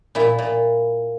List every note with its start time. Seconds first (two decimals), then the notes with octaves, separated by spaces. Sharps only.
0.15 A#2 E4
0.38 A#2